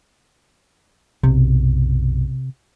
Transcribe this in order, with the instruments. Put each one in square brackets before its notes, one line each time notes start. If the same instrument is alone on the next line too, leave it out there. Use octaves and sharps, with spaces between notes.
[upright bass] B1 F#2 [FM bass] C3